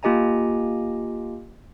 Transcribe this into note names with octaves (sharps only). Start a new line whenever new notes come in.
A#3 F4 G4 D#5 G#5 A#5